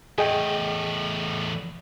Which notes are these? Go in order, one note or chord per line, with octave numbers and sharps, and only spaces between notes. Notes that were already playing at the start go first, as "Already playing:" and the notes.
E2 A2 G#4 D#5 G5